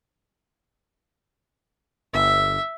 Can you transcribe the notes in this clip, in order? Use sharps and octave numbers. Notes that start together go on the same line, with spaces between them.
G1 E5